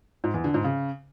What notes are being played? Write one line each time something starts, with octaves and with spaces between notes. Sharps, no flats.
G#2
E2
D3
G#2
C#3